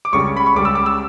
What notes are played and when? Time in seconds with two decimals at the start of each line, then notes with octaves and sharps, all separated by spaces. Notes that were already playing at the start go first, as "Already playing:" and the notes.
0.05 D6
0.13 C#2 C#3 G3 C#6
0.37 B5
0.46 C#6
0.54 C#2 C#3 G3 D6
0.65 E6
0.75 D6
0.86 E6